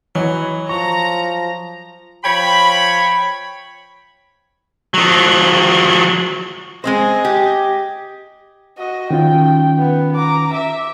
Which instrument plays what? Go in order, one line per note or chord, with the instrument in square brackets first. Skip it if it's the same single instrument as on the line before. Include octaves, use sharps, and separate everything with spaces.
[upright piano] E3 C#5 D#5 [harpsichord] F#3
[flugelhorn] F3 [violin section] A#5 [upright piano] C#6
[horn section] F3 C#5 G5 B5
[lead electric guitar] F3 F#3
[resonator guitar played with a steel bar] G#3 C4 C5 [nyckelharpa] D#5 G#5
[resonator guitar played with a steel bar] G4
[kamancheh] F#4 D#5
[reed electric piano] D#3 C#4 F4 [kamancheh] G5
[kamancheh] B3
A#5 D6
E5